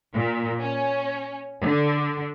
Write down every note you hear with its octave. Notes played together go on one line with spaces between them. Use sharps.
A#2
C#4
D3